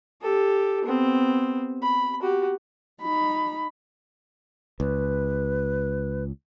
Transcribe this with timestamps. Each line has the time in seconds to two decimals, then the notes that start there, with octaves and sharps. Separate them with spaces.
0.22 G4 A4
0.85 B3 C4
1.82 B5
2.22 F#4 G4
3.02 D#4 B5
4.80 C#2 B4